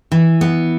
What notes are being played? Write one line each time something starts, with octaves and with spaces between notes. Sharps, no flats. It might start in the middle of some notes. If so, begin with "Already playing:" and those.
E3
B3